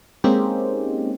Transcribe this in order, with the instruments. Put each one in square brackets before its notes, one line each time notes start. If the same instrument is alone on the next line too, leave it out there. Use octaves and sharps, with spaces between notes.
[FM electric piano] G#3 A#3 C4 C#4 D#4 G4